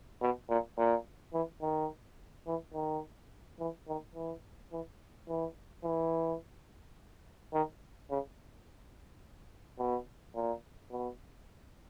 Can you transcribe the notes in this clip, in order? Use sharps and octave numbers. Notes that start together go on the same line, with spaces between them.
B2
A#2
A#2
E3
D#3
E3
D#3
E3
D#3
E3
E3
E3
E3
D#3
C#3
B2
A#2
B2